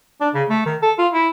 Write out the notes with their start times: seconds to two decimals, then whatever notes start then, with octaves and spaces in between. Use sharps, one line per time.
0.21 D4
0.34 C#3
0.49 A3
0.66 D#3
0.82 A4
0.99 F4
1.13 E4